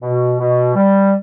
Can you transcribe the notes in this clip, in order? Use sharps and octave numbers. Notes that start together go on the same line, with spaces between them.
B2
B2
G3